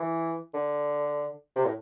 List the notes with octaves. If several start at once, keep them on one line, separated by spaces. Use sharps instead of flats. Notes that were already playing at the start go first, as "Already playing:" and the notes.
Already playing: E3
D3
C3
A2